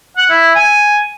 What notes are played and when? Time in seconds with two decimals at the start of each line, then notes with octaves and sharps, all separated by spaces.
0.17 F#5
0.30 E4
0.55 G#5